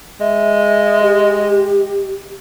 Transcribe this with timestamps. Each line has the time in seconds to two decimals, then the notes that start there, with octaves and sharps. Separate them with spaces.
0.21 G#3 E5
1.03 G4